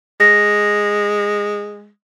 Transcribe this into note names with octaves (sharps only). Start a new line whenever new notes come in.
G#3 A#6